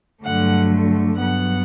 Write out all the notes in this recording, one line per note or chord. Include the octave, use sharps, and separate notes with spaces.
G2 D3 F#3 A3 F#5
G2 F#3 B3 F#5